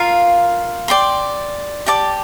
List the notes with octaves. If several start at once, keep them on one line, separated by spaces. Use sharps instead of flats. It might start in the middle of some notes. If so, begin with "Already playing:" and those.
Already playing: F4 A#4 F5
D5 G5 C6
G4 D5 A5 D6